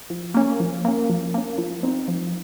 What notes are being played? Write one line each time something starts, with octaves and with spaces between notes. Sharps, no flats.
F3
A#3 C#4
F3
A#3 C#4
F3
A#3 C#4
F3
C4 D#4
F3